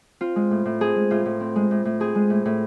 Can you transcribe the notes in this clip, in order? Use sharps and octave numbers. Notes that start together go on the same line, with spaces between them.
C4 F4
G#3
A2
A2
C4 G#4
G#3
A2 F4
A2
C4
G#3
A2
A2
C4 G#4
G#3
A2
A2